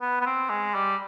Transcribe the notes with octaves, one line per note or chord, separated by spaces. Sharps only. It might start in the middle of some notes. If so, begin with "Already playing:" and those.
B3
B3
C4
G#3
G3